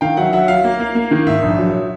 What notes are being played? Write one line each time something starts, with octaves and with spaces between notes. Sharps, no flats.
D#3 F5 G5
F#3 E5 F#5
F#3 E5 F#5
F#3 F5
A#3
A#3
A#3
D#3
G#2 E5
A#1
F#3